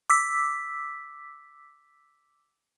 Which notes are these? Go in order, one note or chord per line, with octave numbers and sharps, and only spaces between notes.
D6 E6 B6